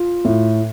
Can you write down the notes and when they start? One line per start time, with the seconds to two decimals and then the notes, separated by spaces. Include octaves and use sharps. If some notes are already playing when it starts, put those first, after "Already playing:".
Already playing: F4
0.25 A2